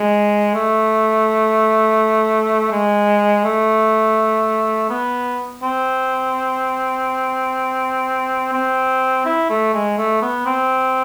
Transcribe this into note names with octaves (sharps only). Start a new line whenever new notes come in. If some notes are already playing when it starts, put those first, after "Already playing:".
Already playing: G#3
A3
G#3
A3
B3
C4
C4
E4
A3
G#3
A3
B3
C4